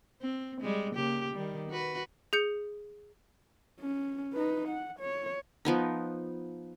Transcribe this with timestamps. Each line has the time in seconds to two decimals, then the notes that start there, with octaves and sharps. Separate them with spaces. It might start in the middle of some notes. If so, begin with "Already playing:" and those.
0.22 C4
0.61 G3 G#3
0.95 C#3 A#3 G4
1.33 D#3 G3
1.70 F#4 B4
2.33 G#4 G6 C#7
3.80 C#4
4.33 D#4 B4
4.68 F#5
5.00 C#5
5.65 F3 B3 D#4